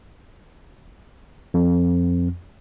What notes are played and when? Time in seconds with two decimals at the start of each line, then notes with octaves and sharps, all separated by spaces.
1.54 F2